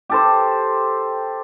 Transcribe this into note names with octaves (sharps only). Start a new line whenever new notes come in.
G4 A4 C5